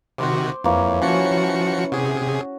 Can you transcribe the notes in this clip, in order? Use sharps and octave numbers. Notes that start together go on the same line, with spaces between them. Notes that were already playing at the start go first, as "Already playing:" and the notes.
C3 D#3 F#4 C5 C6 D6
F2 E3 A#3 C#5
F3 C#4 F#4 G#5 A5 C#7
C3 F#4 G#4